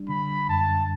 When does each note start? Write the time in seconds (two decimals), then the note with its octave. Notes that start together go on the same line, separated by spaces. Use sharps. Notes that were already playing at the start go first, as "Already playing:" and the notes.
Already playing: G3 D4
0.09 D3 B5
0.49 F#2 A5